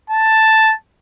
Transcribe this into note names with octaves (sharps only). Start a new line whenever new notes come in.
A5